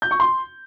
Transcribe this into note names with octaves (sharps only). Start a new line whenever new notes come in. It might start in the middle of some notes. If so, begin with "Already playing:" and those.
G6
C#6
C6